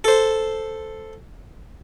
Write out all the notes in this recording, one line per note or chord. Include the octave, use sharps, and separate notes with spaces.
A4 C5